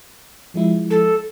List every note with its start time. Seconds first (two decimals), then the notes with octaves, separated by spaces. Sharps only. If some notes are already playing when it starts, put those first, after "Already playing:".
0.54 F3 G#3 E4
0.90 A4